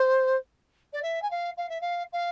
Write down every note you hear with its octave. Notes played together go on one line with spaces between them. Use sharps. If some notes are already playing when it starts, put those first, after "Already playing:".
Already playing: C5
D5
E5
G#5
F5
F5
E5
F5
F5